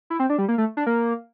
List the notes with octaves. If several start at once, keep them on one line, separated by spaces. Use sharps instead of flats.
E4
C4
D4
G3
A#3
A3
D4
A#3